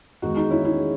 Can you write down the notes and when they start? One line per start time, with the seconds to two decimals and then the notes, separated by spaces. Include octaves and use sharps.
0.22 E2 D#3 G#3 D#4 F#4
0.37 D#4
0.51 C#4 E4
0.65 E4 G#4